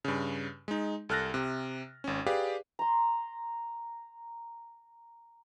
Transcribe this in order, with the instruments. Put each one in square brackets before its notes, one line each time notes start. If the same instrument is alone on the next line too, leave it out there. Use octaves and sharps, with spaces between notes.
[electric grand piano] G2 C#3
G#3 D#4
C2 A4 F6 F#6 A6 A#6
C3
G#1 C#4
G4 G#4 B4 D5 F5
[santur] A#5 C6